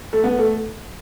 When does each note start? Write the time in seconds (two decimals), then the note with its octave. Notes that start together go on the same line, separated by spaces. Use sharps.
0.13 A3
0.24 B3
0.39 A3